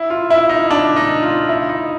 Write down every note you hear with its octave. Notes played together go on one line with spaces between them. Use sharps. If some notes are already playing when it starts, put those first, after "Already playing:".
Already playing: E4
F4
E4
D#4
D4
D#4
F4
E4
D#4